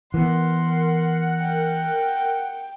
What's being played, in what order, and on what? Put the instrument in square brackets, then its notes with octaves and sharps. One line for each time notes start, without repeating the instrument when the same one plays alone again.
[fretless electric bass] E3 B3 [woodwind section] A#4 F#5 [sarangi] C6
[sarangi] G5